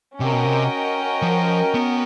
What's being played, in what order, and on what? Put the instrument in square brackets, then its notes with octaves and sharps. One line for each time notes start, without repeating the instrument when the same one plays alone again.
[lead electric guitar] C3 [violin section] C#4 F#4 A#4 D#5 G5
[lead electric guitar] B2
C3
F3
B3